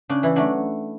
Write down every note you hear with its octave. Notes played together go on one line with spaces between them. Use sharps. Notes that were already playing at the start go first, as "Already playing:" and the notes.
C#3 D4
E3 E4
F#3 A3 D4